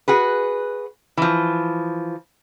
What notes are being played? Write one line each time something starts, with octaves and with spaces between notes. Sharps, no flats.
F#4 G#4 B4
E3 F3